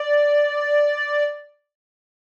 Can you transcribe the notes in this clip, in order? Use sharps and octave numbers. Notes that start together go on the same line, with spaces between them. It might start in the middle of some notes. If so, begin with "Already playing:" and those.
Already playing: D5